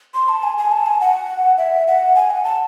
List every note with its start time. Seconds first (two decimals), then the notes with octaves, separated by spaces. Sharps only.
0.14 C6
0.29 A5
0.43 G#5
0.58 G#5
0.72 A5
0.86 G#5
1.01 F#5
1.58 E5
1.87 F#5
2.16 G#5
2.30 F#5
2.44 A5